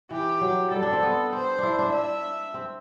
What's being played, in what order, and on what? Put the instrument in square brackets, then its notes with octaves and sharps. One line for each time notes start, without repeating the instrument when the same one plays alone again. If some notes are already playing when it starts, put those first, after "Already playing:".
[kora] E3 [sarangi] G4
[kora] F#3
[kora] G3 [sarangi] A4
[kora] D4
C4
B3
[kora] C4 [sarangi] C5
[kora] D4 E4
D4
[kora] D4 [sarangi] E5
[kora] C4